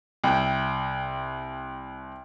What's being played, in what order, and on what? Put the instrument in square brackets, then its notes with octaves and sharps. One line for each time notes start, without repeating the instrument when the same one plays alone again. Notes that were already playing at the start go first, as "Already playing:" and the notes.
[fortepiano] C2 G5